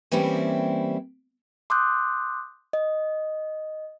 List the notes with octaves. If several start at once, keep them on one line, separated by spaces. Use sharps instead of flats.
E3 G3 A#3 C4 C#4 E4
C6 D6 D#6 F#6 G6
D#5